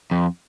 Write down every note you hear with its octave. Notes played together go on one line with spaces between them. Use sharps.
F2